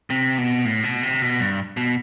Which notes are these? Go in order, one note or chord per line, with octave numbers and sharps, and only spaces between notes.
C3
B2
A2
B2
C3
B2
G2
B2